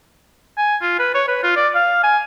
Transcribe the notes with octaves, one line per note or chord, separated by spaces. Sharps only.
G#5
F4
B4
C#5
B4
F4
D5
F5
G#5